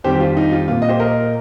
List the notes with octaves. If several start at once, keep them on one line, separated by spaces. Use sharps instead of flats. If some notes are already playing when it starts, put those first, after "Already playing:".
F2 D#3 G3 C4 G4 C5
G4
F4
D#4
F4
A#2 A#3 F4
D#5
G4 C5
A#4 D#5